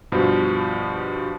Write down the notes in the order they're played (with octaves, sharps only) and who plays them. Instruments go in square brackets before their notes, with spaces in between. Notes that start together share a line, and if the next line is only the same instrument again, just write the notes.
[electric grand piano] G2 B2 F3